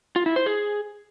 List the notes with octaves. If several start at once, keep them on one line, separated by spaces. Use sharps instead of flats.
F4
E4
C5
G#4